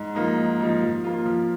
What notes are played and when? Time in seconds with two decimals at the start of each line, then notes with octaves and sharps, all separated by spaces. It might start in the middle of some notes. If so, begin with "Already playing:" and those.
Already playing: G#2
0.15 F3 A#3 D#4
0.37 G#2
0.60 F3 A#3 D#4
0.82 F3
1.04 A#3 F4
1.26 F3